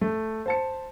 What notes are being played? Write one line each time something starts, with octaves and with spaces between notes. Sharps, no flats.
A3
C5 A5 C#7